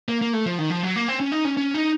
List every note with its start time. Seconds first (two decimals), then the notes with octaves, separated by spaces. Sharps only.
0.08 A#3
0.22 A#3
0.33 A3
0.46 F3
0.58 D#3
0.70 F3
0.83 F#3
0.96 A#3
1.08 C4
1.20 C#4
1.32 D#4
1.45 C#4
1.57 C#4
1.74 D#4